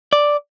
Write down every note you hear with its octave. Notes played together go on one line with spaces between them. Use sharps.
D5